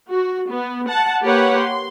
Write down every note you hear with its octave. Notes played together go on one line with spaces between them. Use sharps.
F#4
B3
F#5 A5
A#3 G4 B4 C#5 F#5 B5
C6